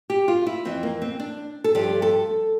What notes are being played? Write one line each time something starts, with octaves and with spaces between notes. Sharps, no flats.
G4
F4
E4
F2 E3 C4
A#3
C4
D4
A4
G2 F3 G4
A4